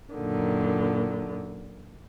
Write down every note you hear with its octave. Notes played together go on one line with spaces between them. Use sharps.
F#2 A#2 D3 D#3